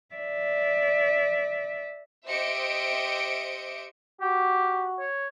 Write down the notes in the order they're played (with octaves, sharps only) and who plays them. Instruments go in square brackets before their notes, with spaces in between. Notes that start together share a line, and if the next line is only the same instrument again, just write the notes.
[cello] D5 E5
[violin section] G4 C5 D#5 E5 C#7 D7
[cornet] F#4 [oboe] G4
[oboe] C#5